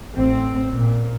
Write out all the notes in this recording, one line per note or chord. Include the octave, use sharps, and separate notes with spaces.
A1 C4
A#2